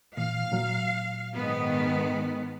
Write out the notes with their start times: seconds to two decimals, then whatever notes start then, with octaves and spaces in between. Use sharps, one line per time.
0.17 A#2 E3 F5
0.51 A#2 F#3
1.36 G#2 D#3 B3